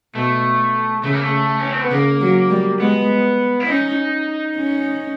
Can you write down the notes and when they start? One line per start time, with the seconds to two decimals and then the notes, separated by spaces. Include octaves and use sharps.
0.14 B2 A3
1.03 C#3 A3
1.13 A#3
1.22 A3
1.59 C#4
1.71 C4
1.81 B3
1.91 C#3 A#3
2.21 F#3
2.50 G3
2.79 G#3 B3
3.60 E4
3.67 C#4 D#4
4.56 C#4